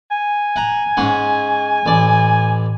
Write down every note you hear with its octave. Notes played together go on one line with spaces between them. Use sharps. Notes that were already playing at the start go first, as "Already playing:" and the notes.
G#5
F#5 A#5
G#2 C#4 F#5
A1 D5